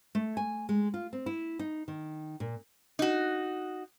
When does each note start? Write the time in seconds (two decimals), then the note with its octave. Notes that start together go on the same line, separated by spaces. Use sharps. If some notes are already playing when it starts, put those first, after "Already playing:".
0.15 A3
0.37 G#5
0.69 G#3
0.94 F4
1.13 C4
1.26 E4
1.59 D#4
1.88 D#3
2.40 A#2
2.99 D#4 F#4